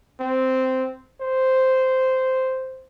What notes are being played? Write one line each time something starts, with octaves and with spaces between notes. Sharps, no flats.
C4
C5